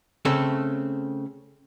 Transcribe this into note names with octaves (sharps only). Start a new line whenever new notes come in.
C#3 A3 C4 A4